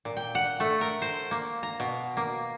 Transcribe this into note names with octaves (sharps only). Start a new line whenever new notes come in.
A#2
G5
F#5
A3
A#4
C5
A#3
A#5
B2
A#3